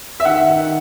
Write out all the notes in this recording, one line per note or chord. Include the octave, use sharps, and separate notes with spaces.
E5
D#3 F#5
D#3